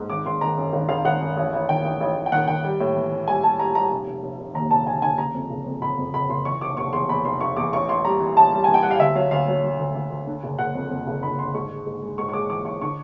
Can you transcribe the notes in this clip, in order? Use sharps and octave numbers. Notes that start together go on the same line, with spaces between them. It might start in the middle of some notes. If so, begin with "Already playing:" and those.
Already playing: G#2
G#1 D6
G#1 C6
D#3 A#5
F#2
G#1
G#1 F5
G#1 F#5
F#2
A1
A1
D#3 G5
A1
A1
A1
G5
D#3 F#5
D#3 G5
G3
A2
E3
E3
G3 G#5
G3 A5
G3 A#5
G3 A#5
F1
F1
F1
F1
D#2 A#5
F1 A5
D3 G#5
D3 G#5
C#3 A#5
F2
F#1
F2
F#1 B5
F2
F#1 B5
F#1 C6
E3 C#6
F1 D6
F1 C#6
E2 C6
E2 B5
F1 C6
F1 C#6
E2 D6
A1 C#6
A1 C6
G3 A#5
E3
A1 A5
G3
G#5
E3
G5
G3 F#5
F5
D2 E5
F#3 F5
D2 F5
F#3
F#3
D2
D2
D2
D3
F#1
F#1 F#5
F2
F2
F#1
D3 B5
D3 C6
G#2 C#6
G#3
G#2
G#3
G#2 C#6
C#6
G#3 D6
E3 D6
A1 C#6
D3 C#6